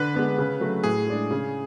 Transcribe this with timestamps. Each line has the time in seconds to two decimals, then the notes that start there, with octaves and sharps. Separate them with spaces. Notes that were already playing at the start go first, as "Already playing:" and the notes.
Already playing: D3 B4
0.15 G#3 B3 D4
0.38 C#3
0.61 F#3 A3
0.84 A2 G#4
1.07 G#3 D4
1.31 C#3